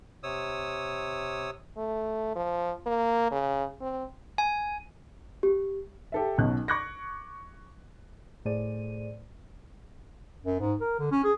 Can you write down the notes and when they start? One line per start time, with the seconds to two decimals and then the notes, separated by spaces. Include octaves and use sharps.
0.23 C3 C#5 D#6 E6
1.77 A3
2.35 F3
2.86 A#3
3.31 C#3
3.81 C4
4.38 G#5
5.43 G4
6.12 G4 A4 E5
6.38 B1 B2 C#4 F#6
6.68 C#6 D6 F#6 G#6 A#6
8.45 A2 A3 G#4 C5 D5 D#7
10.45 F#2
10.60 G#2
10.81 A#4
10.99 D3
11.12 C#4
11.24 G#4